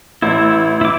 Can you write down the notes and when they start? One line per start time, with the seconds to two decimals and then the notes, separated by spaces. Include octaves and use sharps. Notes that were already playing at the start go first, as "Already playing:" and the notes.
0.22 A1 E4
0.81 E4 D6